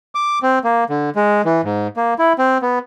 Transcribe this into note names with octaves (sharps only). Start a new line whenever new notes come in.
D6
C4
A#3
D3
G#3
E3
G#2
A#3
E4
C4
B3